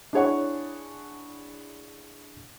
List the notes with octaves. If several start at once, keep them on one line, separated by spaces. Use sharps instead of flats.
D4 E4 G#4 C#5 F#5 C#6